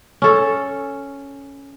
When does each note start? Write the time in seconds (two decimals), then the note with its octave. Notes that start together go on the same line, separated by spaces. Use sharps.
0.22 C#4 A4